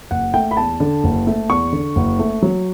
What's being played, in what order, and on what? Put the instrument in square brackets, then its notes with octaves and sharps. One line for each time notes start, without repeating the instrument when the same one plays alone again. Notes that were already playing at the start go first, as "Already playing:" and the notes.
[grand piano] F#1 F#5
A3 G5
B5
E2 A5
D3
F#1
A3
E2 C#6
D3
F#1
A3
F#3